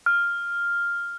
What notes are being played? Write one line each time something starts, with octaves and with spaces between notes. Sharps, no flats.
F6